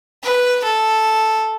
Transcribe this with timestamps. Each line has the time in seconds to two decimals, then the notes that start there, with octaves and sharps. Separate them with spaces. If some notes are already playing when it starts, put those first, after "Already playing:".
0.24 B4
0.64 A4